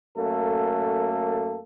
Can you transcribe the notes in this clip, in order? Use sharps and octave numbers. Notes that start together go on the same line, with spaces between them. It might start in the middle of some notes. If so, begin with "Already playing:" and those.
F#2 A3 A#3 A4